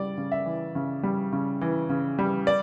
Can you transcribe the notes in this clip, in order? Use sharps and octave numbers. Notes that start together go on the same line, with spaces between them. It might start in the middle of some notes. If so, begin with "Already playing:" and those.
Already playing: C#3 G3 D5
C#3
E5
E3
C#3
G3
C#3
E3
C#3
G3
D5